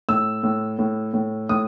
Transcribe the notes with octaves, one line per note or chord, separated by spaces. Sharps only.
A2 E6
A2
A2
A2
A2 D#6